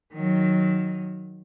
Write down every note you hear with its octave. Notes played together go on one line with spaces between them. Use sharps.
D#3 F#3